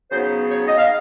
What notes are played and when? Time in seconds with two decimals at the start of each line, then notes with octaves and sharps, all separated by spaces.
0.10 C#3 F#3 B3 D#4 C5
0.49 C#5
0.67 D#5
0.77 F5